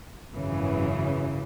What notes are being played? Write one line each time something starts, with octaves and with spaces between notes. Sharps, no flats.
G#1 F#2 C#3 E3